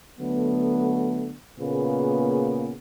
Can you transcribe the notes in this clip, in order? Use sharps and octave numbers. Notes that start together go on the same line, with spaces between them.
D3 F#3 A3 B3
A#2 C#3 A#3 B3 G#4 B4